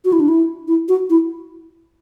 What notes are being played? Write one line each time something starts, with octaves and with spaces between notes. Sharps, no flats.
F#4
E4
D4
E4
E4
F#4
E4